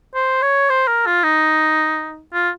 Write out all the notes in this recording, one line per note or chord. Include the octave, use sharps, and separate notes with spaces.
C5
C#5
C5
A#4
F4
D#4
F4